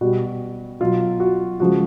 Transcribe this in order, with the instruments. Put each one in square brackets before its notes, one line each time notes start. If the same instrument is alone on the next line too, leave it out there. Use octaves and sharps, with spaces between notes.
[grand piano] B2 G3 F#4
B2 F#3 F4
F#4
C#3 F3 G#3 F#4